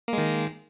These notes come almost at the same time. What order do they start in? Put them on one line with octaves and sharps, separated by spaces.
A#3 G#3 D#3